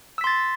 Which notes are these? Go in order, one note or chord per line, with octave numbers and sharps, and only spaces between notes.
C6 E6 A6 B6